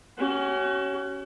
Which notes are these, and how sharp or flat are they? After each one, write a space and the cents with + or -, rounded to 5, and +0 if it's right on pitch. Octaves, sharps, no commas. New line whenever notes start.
C#4 +0 F#4 +40